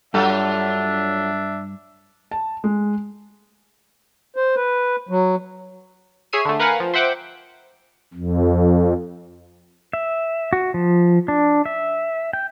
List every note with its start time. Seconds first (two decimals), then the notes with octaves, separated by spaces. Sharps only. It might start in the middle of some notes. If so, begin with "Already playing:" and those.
0.14 G2 F#3 D4 F4 A4 E5
2.31 A5
2.64 G#3
4.36 C5
4.56 B4
5.09 F#3
6.33 G#4 C#5 E5 C7 D#7
6.45 D3 A3
6.60 A#4 B4 F5 F#5 G#5
6.80 F3
6.94 C5 E5 F#5 G5 D6
8.14 F2
9.93 E5
10.53 F#4
10.74 F3
11.28 D4
11.66 E5
12.33 G5